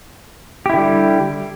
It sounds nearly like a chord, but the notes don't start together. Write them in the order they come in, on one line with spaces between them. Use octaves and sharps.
G4 E4 D3 G3